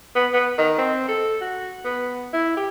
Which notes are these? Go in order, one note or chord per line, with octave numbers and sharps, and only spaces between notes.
B3
B3
D#3
C4
A4
F#4
B3
E4
G4